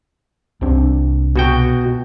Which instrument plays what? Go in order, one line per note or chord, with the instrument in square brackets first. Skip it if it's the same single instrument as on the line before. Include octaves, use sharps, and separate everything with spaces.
[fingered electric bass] C2 C4 D4
[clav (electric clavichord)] B2 F#4 G5